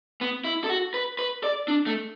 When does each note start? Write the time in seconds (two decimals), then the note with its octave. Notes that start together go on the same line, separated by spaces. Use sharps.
0.21 B3
0.45 E4
0.64 A4
0.70 F#4
0.94 B4
1.19 B4
1.44 D5
1.68 D4
1.86 A3